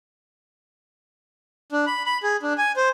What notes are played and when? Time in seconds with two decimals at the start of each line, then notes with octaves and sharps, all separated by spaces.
1.72 D4
1.87 B5
2.06 B5
2.23 G#4
2.43 D4
2.58 G#5
2.76 C5